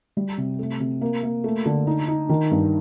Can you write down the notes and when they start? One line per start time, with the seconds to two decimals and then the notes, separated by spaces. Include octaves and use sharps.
0.17 G3
0.38 C3
0.59 A3
0.80 C3
1.01 A#3
1.23 A#3
1.44 A3
1.65 D3
1.87 D#4
2.08 D#4
2.29 D#3
2.51 G2